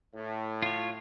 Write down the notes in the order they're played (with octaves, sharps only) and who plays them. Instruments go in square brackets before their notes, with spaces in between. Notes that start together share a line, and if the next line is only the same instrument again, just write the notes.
[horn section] A2
[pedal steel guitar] F4 C#5